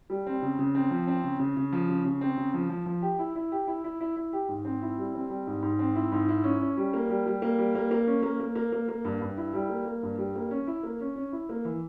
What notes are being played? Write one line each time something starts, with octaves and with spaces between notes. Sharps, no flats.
G3
C4
C#3
C#3
C4
F3
C4
C#3
C#3
C#3
F3
C#3
C#3
C4
C#3
F3
F3
F3
G4
E4
E4
G4
E4
E4
E4
E4
G4
G#2
C4
E4
G3
C4
G3
G#2
G#2
C4
E4
G#2
E4
C#4
C#4
G3
A#3
G3
G3
A#3
G3
A#3
A#3
C#4
A#3
A#3
A#3
A#3
A#3
G2
G2
E4
G3
A#3
A#3
G2
G3
A#3
C#4
E4
A#3
C#4
C#4
E4
A#3
E3